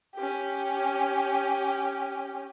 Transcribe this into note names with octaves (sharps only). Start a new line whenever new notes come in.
C#4 G4